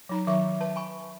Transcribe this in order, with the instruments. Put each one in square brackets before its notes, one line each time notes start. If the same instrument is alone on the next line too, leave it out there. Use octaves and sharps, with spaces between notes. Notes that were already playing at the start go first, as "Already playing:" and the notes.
[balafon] F#3 D#4 A#5
[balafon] D#3 F#3 C#6 [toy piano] E5
[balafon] B4 [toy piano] A5
[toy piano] G#5 B5 C#6